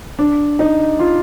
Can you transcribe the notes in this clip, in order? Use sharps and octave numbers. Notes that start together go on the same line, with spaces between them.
D4
D#4
F4